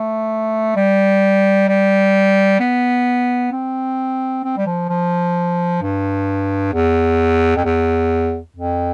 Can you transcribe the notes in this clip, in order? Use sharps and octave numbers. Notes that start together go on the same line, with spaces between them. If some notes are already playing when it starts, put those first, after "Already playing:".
Already playing: A3
G3
G3
B3
C4
C4
G3
F3
F3
G2
E2
F2
E2
F2